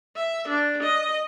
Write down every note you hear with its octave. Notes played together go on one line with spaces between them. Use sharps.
E5
D4
D#5